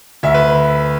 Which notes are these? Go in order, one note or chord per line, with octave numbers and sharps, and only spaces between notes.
D2 E5
B4